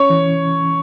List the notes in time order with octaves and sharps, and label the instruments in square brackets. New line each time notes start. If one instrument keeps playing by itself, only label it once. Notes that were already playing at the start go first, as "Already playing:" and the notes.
Already playing: [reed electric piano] C#4 [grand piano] C#5
[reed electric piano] E3